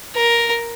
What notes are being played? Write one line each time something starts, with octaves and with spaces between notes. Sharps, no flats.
A#4